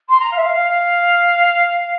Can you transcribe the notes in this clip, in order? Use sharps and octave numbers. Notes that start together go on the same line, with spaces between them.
C6
A#5
F5
E5
F5
F5